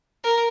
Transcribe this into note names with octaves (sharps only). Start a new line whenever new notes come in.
A#4